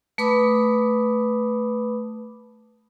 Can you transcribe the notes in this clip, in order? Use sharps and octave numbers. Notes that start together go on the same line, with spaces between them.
A3 B4 B5 D6 D#6